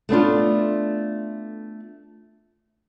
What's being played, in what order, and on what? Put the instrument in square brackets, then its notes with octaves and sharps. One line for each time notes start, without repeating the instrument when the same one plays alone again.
[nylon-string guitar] A3 B3 D4 F4